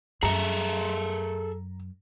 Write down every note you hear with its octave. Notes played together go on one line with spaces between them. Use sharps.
F#2 G#4 A4 E5 A#5